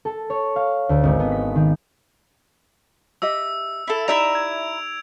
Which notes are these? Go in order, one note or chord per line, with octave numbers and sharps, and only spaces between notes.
A4
C#5
F5
D2
G#1
B3
B6
D#3
G4 D#5 E5 E6
E4 A4
D#4 E4 G4 D5 E5 A#5 D7 F7
G#6